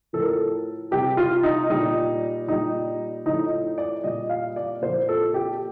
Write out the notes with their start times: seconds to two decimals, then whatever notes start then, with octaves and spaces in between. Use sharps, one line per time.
0.13 A2 F3 A4
0.20 A#4
0.28 A4
0.91 C3 G3 G4
1.17 F4
1.43 D#4
1.70 A#2 G3 D#4
2.47 A#2 G3 D#4
3.25 A2 F3 D#4
3.78 D5
4.04 A#2 G3 D#5
4.29 F5
4.56 D5
4.81 A#2 F3 C5
5.09 A4
5.34 G4